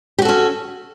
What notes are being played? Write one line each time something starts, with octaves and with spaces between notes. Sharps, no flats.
C#4 F#4 G4 A4